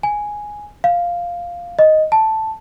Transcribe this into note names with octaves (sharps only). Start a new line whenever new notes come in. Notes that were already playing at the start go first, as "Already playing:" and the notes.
G#5
F5
D#5
A5